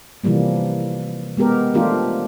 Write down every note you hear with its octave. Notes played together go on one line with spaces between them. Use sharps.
C3 E3 F3 G3 A#3
G#3 B3 G4 A#4
F3 A3 D4 F4 G4 A#4